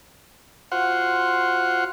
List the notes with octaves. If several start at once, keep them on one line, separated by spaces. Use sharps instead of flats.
F4 F#4 C5 F#5